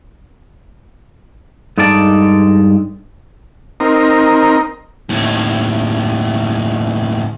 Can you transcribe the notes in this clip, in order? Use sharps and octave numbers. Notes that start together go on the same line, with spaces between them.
G2 G#3 D#4 A4 D5 A5
C4 D#4 A#4
D#2 A2